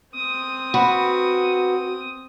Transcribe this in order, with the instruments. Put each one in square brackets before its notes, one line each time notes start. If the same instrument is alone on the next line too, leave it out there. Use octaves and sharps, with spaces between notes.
[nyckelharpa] C4 D#6
[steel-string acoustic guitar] F#4 B4